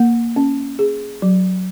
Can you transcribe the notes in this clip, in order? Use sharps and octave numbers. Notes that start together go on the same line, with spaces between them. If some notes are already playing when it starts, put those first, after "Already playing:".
Already playing: A#3
C#4
G#4
F#3